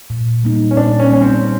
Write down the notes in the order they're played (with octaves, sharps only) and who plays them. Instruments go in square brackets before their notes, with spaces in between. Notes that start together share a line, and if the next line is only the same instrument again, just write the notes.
[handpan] A#2
G3 A#3 D#4
[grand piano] C#4
[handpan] A#2 [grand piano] D4
[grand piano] C#4
[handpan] G3 A#3 D#4 [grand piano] C#4
[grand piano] C4